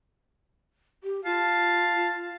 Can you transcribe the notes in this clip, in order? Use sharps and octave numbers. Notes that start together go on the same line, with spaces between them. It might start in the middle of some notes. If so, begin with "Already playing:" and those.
G4
F4 F5 A5